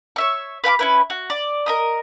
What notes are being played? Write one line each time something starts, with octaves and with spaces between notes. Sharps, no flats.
C#5 E5 C#6
B4 F5 G5 D6
C#4 E4 B4
F#4
D5
A#4 D#5 D#6